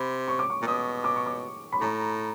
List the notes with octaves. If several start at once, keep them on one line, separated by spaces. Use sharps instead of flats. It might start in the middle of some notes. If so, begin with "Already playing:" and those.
Already playing: C3 B5
C#6
D6
C#6
A#2
B2 D#6
D6
C#6
D6
B5
A2 A#5